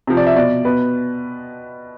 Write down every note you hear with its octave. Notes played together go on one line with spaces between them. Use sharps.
C3 F3
D5
E5
B2 D5
B2 B4